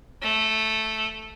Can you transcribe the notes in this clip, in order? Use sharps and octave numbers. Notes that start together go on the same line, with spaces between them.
A3